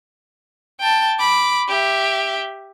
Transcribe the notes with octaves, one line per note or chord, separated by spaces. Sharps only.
G5 A5
B5 D6
G4 E5